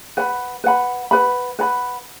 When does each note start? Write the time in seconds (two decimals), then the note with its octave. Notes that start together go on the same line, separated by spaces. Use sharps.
0.17 B4 F#5 B5
0.64 B4 F#5 B5
1.11 B4 F#5 B5
1.59 B4 F#5 B5